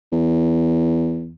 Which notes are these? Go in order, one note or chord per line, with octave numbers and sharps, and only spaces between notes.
E2